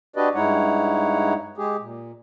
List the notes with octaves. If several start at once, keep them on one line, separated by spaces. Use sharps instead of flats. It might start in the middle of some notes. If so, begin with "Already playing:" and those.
D4 F#4 G4 B4 D5 D#5
G2 G#3 D#4 E4 C#5 F#5
G#3 G4 G#4
A#2